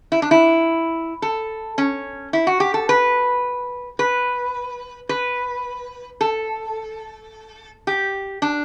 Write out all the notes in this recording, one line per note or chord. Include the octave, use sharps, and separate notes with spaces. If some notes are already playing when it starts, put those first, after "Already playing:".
E4
D4
E4
A4
C#4
E4
F#4
G4
A4
B4
B4
B4
A4
G4
D4